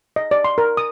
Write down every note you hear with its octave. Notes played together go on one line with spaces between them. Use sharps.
D#5
D5
C6
A#4
D#6